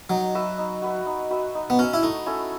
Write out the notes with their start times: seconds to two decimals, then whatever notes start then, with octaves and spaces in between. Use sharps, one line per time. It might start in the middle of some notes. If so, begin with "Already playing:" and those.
0.10 F#3 D#4
0.35 F#4 B4 E5
0.58 D#4
0.82 F#4 B4 E5
1.06 D#4
1.30 F#4 B4 E5
1.55 D#4
1.70 B3
1.79 C#4 F#4 B4 E5
1.94 E4
2.03 A3 D#4
2.26 C#4 E4 A4